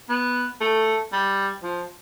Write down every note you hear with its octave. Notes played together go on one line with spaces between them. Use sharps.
B3
A3
G3
F3